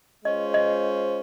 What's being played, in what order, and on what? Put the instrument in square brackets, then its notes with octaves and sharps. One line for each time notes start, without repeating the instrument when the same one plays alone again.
[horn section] G#3 C#4 F4 C5 [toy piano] D#5
[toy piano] D#5